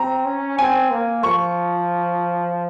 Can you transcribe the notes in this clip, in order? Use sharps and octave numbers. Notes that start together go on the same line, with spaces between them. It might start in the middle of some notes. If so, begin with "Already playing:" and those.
Already playing: C4 A#5
C#4
C4 G#5
A#3
F3 C#6